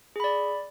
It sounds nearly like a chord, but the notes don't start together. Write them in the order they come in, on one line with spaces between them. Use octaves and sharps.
G#4 B5 D5